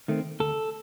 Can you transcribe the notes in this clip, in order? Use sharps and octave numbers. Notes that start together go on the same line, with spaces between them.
D#3 A3 C4
D2 A4